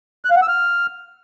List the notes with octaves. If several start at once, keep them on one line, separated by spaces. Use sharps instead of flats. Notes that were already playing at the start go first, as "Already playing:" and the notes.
F#6
F5
F#5
E6
F6